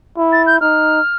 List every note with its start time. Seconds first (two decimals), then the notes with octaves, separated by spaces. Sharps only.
0.17 E4
0.32 A6
0.46 G6
0.60 D#4 F6